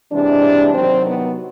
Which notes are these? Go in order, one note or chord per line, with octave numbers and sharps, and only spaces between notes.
C3 E3 G#3 D4
C3 D#3 F#3 C4
B3